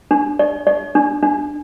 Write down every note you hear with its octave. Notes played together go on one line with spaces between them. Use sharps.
D4
D5
D5
D4
D4